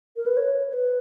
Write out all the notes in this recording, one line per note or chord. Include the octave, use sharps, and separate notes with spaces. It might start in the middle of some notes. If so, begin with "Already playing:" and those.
A#4
B4
C#5
C#5
B4